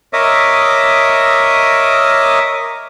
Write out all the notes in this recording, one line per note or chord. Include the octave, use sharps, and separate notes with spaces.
A#4 C#5 D#5 E5 D6 D#6